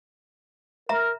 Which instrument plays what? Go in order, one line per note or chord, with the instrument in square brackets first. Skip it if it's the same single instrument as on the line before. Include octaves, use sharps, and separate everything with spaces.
[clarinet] A#4 [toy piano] E5 A#5